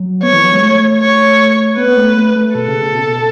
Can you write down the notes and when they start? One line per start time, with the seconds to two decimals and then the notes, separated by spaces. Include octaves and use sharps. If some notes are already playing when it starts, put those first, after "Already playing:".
Already playing: F#3
0.23 B3 C#5
0.33 E3
0.42 F#3
0.52 G#3
0.62 A3
1.00 C#5
1.77 B3 B4
1.87 B3
1.97 A3
2.16 A3
2.36 A3
2.55 B2 A4
2.68 C#3
2.81 C#3
2.94 B2
3.07 B2